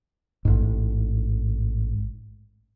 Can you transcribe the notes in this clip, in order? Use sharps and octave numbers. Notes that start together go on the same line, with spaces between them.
A1 G#2